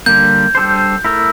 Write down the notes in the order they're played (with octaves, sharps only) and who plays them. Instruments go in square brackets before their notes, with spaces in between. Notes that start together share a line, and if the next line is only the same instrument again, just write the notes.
[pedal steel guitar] D3 G3 A#3 [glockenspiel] G6
[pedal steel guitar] G3 D4 A4 C5
A3 E4 A#4